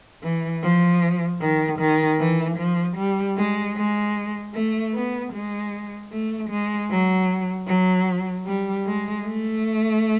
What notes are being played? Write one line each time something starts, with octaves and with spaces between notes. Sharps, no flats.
E3
F3
D#3
D#3
E3
F3
G3
G#3
G#3
A3
B3
G#3
A3
G#3
F#3
F#3
G3
G#3
A3